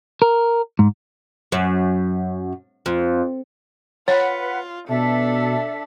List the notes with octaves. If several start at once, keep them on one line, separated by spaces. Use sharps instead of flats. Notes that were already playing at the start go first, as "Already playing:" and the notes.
A#4
G#2
F#2
F2
F4 B4 C#5 F#5
B2 D4 A4 E5